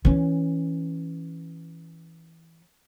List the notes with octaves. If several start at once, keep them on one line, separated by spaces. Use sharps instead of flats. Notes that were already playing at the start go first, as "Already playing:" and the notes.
E3 C#4